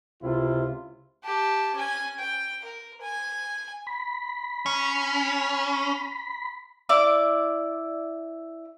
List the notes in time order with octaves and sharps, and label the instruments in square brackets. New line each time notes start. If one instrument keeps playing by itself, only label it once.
[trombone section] C#2 C3 E4 F4
[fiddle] G4 A5
C#4 G#5
G5
A#4
G#5
[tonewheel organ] B5
[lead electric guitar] C#4
[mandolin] E4 D5 D6